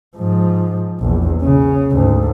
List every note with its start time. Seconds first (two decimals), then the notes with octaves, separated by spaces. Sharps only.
0.17 G#2 F3
1.00 A#1 E2
1.42 C#3
1.92 D2 G#2